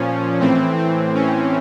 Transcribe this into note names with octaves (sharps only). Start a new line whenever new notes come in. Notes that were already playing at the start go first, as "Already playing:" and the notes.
Already playing: A#2 F3 C#4
A2 E3 C4
C4
C#4